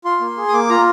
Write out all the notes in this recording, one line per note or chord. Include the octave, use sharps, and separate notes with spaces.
F4 C6
A#3
G#4
D#6
A#3 D6
F4 A#5